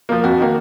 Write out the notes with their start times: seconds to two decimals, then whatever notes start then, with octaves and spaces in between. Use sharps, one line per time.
0.09 F3 A#3
0.24 F2 F#4
0.39 D#3 A#3